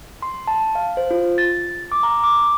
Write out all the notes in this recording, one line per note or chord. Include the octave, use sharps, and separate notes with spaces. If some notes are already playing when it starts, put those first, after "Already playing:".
C6
A5
F5
C5
F4
A6
D6
A#5
D6